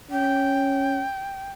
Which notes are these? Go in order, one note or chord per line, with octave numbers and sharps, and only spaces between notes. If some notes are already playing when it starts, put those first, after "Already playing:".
C#4 G5